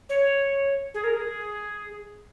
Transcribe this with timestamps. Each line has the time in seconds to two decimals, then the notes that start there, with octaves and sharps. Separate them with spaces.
0.09 C#5
0.94 G#4
1.04 A#4
1.13 G#4